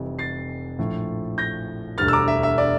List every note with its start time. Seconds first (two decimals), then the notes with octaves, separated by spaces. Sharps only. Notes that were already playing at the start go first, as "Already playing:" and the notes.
Already playing: F1 F2 C3 E3 G3
0.19 A6 C7
0.78 A#1 A2 F3
1.38 G6 A#6
1.98 E1 D2 D3 G3 F6 A6
2.08 E6
2.13 A#5 D6
2.28 E5
2.43 E5
2.58 D5